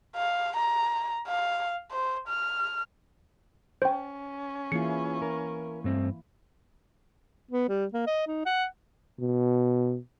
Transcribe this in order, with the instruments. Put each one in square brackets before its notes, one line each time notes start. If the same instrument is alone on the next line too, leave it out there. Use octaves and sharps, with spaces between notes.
[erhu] F5
A#5
F5
C5
F6
[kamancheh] C#4 [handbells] C5 G5
[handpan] E3 A#3 E4 [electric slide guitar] F4 G#4 [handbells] C#7
[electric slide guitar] A#4
G2 A3 C4
[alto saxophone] B3
G3
A#3
D#5
D#4
F#5
[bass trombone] B2